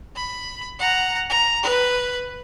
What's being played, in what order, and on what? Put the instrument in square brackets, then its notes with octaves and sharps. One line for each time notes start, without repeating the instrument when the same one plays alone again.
[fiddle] B5
F#5 A#5
A#5
B4